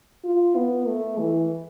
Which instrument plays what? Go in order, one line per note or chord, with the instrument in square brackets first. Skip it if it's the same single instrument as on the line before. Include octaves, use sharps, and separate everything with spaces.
[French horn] F4
B3
A3
E3